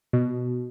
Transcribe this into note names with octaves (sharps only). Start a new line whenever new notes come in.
B2